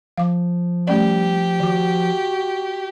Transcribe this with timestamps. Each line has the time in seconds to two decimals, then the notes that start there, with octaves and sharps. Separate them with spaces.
0.18 F3 F5 D6
0.88 G3 A3 C#4 G4 D5
1.60 D#3 F#4 D6